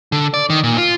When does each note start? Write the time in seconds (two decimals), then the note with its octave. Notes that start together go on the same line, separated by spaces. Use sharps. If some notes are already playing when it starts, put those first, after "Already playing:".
0.12 D3
0.34 D5
0.50 D#3
0.63 A#2
0.78 F4